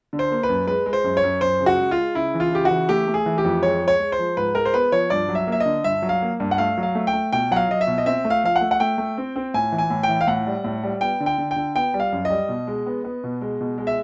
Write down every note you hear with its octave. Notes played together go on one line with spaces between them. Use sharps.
D3
C5
A#3
B4
F#2
G#3 B4
G#3
C5
F#2
C#5
F#2
F#2 C5
C#3
F#4
G#3
F4
G#3
C#3 E4
E3
F4
C#3 G4
F#4
E3
A3 G4
A3
G#4
E3
G4
F2
G#3 C#5
G#3
C#5
G#3
C5
F3
G#2 B4
G#3 A#4
C5
B3 B4
F3 C#5
G2 D5
F#3
E5
A#3
E5
D#5
D3
G2 E5
F#3
F5
A#3
G2
F#5
A3 F5
F#3
F5
A3
G5
A3
B2 G5
F#3 F5 F#5
F#3 D#5
E5
B2
D#5
C4 E5
A3
F5
F3 F5
F#5
A3
F#5
A3 G5
A3
C4
C4
A2 G#5
E3
G#5
A2
G5
E3
F5
A2 F#5
G3
A2
G3
B3 G5
D3
G5
D3
G5
D3
B3 G5
G3
F5
F#2
D#5
G3
B2
G#3
B3
B3
B2
G#3
B2
G#3
E5